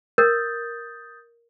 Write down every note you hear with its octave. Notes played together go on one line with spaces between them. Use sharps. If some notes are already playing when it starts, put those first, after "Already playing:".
A#4 D#6 G6 A6